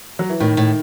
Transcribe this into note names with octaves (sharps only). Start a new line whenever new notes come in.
F#3
E3
A2 D#3
A2